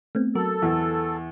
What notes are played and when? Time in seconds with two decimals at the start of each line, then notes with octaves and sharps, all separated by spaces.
0.15 A3 B3 C4
0.35 F#3 F#4 A4 A#4
0.62 E2